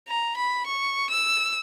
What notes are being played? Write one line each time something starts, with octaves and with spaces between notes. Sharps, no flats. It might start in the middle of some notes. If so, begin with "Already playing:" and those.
A#5
B5
C#6
E6